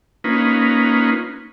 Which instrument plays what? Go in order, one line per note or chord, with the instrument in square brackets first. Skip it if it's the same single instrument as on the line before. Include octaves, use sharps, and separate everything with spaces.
[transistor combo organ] A#3 C#4 D#4 F4 B4